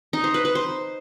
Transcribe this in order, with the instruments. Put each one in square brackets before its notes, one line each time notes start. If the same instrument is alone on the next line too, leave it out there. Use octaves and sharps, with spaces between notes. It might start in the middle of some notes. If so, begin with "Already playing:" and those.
[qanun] D#4
C5
B4
B4
C5